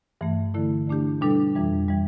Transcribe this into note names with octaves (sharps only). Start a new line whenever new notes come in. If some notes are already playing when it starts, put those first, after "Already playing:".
G2 E3 A3
D3 A3 E4 A4
D3 A3 D4 G4
B2 G3 D4 A4
F2 E3 G3
E3 G3